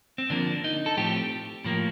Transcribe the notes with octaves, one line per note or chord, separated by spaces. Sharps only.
C4
D3 F3 A#3 D4
D#4
A4
A2 F3 A3 C4 G4
A2 F3 A#3